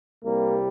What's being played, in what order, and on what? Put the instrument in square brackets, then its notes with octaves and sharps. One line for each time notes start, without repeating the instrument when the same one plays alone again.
[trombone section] C2 C3 G3 A#3